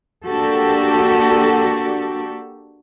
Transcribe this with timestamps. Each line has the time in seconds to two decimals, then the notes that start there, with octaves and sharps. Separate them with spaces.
0.25 A#3 D4 F#4 G4 A4